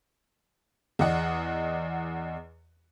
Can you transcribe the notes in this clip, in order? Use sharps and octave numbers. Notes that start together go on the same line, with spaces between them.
E2 D5 D#5 F#5